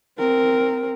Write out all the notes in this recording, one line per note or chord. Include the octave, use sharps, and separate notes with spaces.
C4 A#4